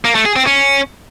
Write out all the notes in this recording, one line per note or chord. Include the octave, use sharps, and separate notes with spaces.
A#3
A3
G#4
C4
C#4